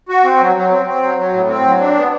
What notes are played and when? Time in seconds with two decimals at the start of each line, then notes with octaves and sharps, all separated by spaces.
0.09 F#4
0.24 C4
0.40 F#3
0.56 F#3
0.71 C4
0.86 C4
1.03 F#3
1.18 F#3
1.33 A2
1.49 C4
1.65 F#3
1.80 D4
1.96 B3